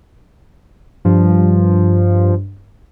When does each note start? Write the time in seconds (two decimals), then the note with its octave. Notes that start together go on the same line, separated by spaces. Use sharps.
1.05 G2 F3